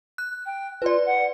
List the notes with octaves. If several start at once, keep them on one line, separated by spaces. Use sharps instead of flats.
F#6
G5
F4 B4 D5
F#5